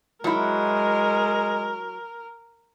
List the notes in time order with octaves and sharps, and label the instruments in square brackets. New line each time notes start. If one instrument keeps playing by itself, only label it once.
[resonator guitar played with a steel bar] F#3 E4 [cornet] G#3 [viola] A#4